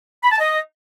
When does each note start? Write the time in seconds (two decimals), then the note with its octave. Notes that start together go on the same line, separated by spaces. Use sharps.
0.23 B5
0.32 A5
0.41 D#5